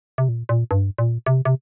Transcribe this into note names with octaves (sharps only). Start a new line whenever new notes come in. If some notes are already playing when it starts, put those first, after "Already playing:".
C3
A#2
A#2
G2
A#2
C3
C3